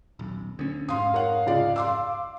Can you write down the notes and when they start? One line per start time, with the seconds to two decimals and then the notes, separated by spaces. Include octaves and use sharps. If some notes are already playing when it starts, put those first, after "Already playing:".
0.19 D#1 B1
0.59 D2 C#4
0.88 F2 G#2 F5 C6 D#6
1.14 A#4 C#5 F#5
1.46 C#2 G#3 D5
1.76 C6 D6 E6